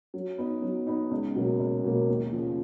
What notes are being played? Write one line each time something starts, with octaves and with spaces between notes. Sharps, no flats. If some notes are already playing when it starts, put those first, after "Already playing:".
F#3
B3 D#4
F#3
B3 D#4
C#2
B2 F#3 A#3
C#2
B2 F#3 A#3
D#2
C#3 F3